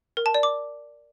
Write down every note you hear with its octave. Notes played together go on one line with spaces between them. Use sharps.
A#4
A5
D5
D6